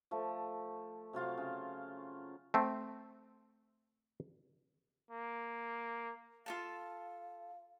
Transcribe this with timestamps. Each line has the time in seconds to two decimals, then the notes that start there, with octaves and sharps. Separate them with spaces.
0.11 F3 A3
1.13 C3 F#3 F4 F5
1.38 C#3
2.54 A3 C4
5.11 A#3
6.46 F4 A4 F5 A5